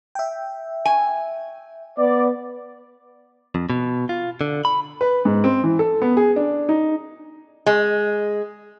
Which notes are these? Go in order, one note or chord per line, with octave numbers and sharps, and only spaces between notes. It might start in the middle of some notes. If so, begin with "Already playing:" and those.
E5 G5
G#5
B3 D5
F2
B2
F4
D3
B5
B4
G#2
C4
E3
A4
B3
G#4
D4
D#4
G#3